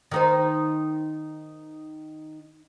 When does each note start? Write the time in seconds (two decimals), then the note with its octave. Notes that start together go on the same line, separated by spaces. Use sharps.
0.11 D#3 D#4 C5